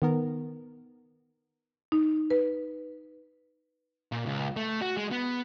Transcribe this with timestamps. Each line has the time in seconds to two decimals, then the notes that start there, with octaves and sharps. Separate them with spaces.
0.02 D#3 B3 A#4
1.92 D#4
2.30 B4
4.12 A#2
4.26 C#2
4.56 A3
4.81 F#4
4.97 G#3
5.11 B3